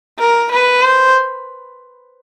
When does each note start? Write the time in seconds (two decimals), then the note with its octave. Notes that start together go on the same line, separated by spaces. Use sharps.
0.19 A#4
0.52 B4
0.82 C5